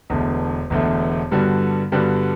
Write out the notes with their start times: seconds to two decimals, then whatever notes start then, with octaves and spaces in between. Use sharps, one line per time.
0.10 E1 E2 D3 A3
0.70 E1 E2 D3 A3
1.31 G2 D3 G3 B3 F#4
1.92 G2 D3 G3 B3 F#4